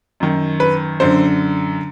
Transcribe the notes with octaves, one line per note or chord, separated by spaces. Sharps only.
F#2 D#3
B4
F#2 D3 C5